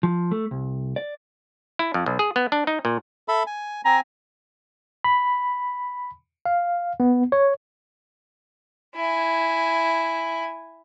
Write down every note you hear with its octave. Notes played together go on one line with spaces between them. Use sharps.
F3
A3
C2
D5
E4
F2
B1
G#4
B3
D4
D#4
A#2
A4 E5 B5
G#5
C4 G#5 A#5
B5
F5
B3
C#5
E4 G#5